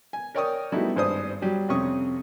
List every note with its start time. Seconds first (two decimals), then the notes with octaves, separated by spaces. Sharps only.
0.13 G#5
0.35 A#4 C#5 D5 G5 C#6 D#6
0.72 G3 A3 B3 D#4 E4 F#4
0.96 G#1 G2 C5 D#6
1.41 F#3 G3
1.68 F2 C3 C4 C#4 C#6 D#6